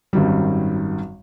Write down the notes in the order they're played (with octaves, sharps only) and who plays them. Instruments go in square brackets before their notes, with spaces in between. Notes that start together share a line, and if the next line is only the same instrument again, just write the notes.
[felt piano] G#1 F#2 D#3 F#3 G3